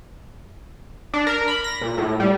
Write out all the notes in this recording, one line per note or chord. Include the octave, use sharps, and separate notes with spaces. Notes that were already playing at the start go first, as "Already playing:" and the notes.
D4
A#4
B5
A#6
A#2
A2
G3